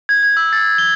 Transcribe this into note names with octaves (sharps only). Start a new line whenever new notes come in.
G#6
G#6
E6
A6
G7